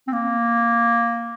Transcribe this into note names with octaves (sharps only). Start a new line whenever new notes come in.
C4
A#3